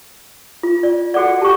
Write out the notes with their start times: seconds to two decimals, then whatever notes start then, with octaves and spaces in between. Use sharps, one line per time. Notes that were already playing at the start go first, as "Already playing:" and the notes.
0.63 F4
0.83 D5
1.14 F#4 A4 D5 F#5
1.42 G4 A5 C#6